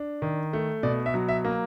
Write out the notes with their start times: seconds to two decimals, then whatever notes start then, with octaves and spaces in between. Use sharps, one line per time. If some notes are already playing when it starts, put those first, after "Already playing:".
Already playing: D4
0.22 D#3
0.53 A3
0.83 B2 D5
1.06 E5
1.14 F#3
1.29 E5
1.45 A#3